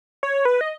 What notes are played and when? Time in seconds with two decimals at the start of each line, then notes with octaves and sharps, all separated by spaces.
0.23 C#5
0.45 B4
0.61 D#5